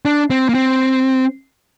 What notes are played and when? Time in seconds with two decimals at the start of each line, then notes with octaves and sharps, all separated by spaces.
0.05 D4
0.30 C4
0.49 A#3
0.55 C4